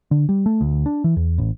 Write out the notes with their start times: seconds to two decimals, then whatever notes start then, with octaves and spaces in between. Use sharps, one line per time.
0.11 D3
0.29 G3
0.46 A3
0.61 D2
0.86 D4
1.04 E3
1.16 E2
1.38 A1